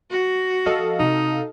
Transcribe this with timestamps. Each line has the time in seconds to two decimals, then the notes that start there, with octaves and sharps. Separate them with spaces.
0.11 F#4
0.66 F3 A4 D#5 F5
0.99 C3 D#4